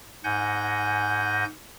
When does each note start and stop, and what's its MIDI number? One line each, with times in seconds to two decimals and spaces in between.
0.24 1.44 44
0.24 1.44 78
0.24 1.44 80
0.24 1.44 91
0.24 1.44 94